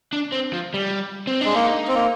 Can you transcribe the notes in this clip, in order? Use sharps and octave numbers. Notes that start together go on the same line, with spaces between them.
D4
C4
F3
G3
C4
G#3 D4
A#3 D#4
C4
A#3